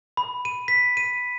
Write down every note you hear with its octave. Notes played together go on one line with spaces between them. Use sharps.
B5
D#7
B6
D#7